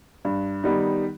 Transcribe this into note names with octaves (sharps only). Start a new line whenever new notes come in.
G2
D#3 G3 B3 D#4